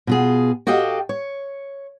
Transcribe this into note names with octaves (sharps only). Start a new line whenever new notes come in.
B2 F4 G#4
F#4 G4 A4 D#5 F5 G5
C#5